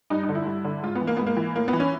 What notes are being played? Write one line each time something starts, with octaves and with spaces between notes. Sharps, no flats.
G2 D#4
D#4
D3
E4
G2
D3
G#2 F4
B3
E3
A#3
G#2 B3
A#3
E3
A2 A#3
B3
E3
C#4